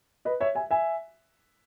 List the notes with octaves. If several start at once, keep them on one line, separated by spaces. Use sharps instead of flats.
B4 D#5
C#5 E5
E5 G#5
E5 G#5